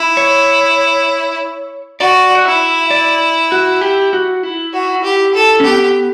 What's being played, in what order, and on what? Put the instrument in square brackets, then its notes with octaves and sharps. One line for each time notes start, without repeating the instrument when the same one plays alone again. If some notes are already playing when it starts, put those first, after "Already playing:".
Already playing: [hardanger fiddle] E4
[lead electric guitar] C#5
[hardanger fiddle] F#4 [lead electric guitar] D5
[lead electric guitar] F#5
[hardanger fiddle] E4 [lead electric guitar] E5
[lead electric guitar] D5
F#4
G4
F#4
E4
[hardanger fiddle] F#4
G4
A4
[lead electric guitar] C#4
[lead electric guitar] B3 [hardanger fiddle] G4